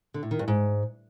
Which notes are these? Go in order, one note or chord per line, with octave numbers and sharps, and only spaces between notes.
D3
A2
D#3
G2
G#2